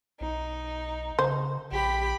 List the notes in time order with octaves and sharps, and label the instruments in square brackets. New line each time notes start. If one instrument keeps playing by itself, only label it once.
[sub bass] B1 [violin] D#4
[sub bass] C#3 [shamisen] C5
[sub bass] A#1 [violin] G4 B5